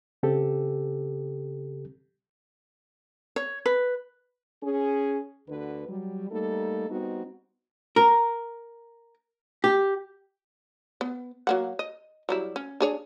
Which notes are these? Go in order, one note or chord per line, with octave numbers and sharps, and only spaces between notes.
C#3 C4 G4 A4
C#5
B4
C#4 G#4
D2 D3 F#4 B4
F#3 G3
G3 A3 A#3 D#4 A4
G3 B3 C4 D#4 F#4
A#4
G4
B3
F#3 A#3 F#5
D#5
F#3 G3 E4
C#4
D4 G#4 C#5